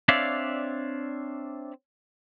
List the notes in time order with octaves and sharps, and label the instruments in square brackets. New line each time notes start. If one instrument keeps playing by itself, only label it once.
[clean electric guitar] C4 D4 C#5 D5 E5 F5